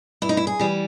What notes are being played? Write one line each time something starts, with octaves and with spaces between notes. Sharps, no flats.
G2 E4
D#4
E4
G#4
E3 G3